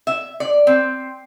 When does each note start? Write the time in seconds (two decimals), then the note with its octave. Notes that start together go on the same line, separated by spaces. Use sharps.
0.07 E5
0.40 D5
0.67 C4